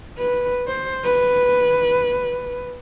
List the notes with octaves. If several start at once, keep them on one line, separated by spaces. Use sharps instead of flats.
B4
C5
B4